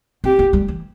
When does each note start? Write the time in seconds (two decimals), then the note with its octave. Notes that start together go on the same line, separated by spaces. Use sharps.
0.24 C4 G4
0.39 B3
0.53 G3
0.68 E3